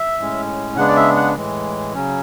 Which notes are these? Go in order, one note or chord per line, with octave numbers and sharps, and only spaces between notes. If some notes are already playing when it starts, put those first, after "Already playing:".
Already playing: E5
A2 G#3 C#4
C#3 G#3 B3 D4 F#5
D5
E5
F#5
A2 E3 G#3
C#3 F#3 C#4